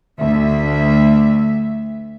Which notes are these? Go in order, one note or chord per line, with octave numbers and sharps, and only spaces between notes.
D2 E5